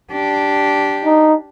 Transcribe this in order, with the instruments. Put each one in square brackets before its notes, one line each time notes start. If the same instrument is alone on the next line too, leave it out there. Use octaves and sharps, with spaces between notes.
[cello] D4 G4
[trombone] D#4